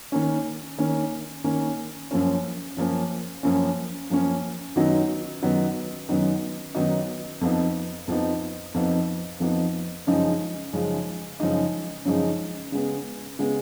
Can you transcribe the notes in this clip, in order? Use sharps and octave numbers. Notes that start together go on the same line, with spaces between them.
D#3 A#3 C#4
D#3 A#3 C#4
D#3 A#3 C#4
F#2 F3 A#3 C#4
F#2 F3 A#3 C#4
F#2 F3 A#3 C#4
F#2 F3 A#3 C#4
F#2 D#3 F#3 B3 D#4
F#2 D#3 F#3 B3 D#4
F#2 D#3 F#3 B3 D#4
F#2 D#3 F#3 B3 D#4
F2 F3 B3 D#4
F2 F3 B3 D#4
F2 F3 B3 D#4
F2 F3 B3 D#4
F#2 C#3 F3 G#3 D#4
F#2 C#3 F3 G#3 D#4
F#2 C#3 F3 G#3 D#4
F#2 C#3 F3 G#3 D#4
C#3 G#3 B3
C#3 G#3 B3